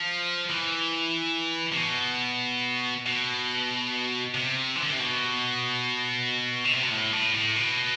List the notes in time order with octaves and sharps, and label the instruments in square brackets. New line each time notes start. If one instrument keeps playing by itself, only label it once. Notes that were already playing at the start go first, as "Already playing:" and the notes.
Already playing: [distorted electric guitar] F3
E3
C3
B2
B2
C3
E3
D3
C3
B2
D3
C3
B2
A2
A2
A2
B2